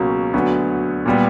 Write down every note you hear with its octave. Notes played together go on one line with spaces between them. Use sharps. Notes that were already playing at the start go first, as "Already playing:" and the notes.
Already playing: C#2 B2 F#3 A#3 C#4
D2 D3 F#3 B3
A#2 G3 B3